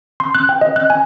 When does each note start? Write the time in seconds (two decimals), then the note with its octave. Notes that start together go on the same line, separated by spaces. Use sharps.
0.20 C6
0.35 F#6
0.49 G5
0.61 D#5
0.76 F#6
0.90 G#5